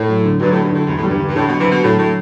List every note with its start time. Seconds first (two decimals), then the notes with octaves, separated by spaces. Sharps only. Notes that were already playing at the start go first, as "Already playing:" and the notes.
Already playing: A2 E4
0.08 F#3
0.25 D3
0.40 G2 F#3
0.52 A2 F#3
0.63 G2
0.72 A2 D3
0.86 E2 G2
0.97 A2
1.03 G3
1.09 G2
1.20 D3
1.29 G2
1.35 A2 D3
1.47 B2 F#3
1.59 C3 E3
1.66 B2 D3
1.83 A2 F#3
1.98 A2 F#3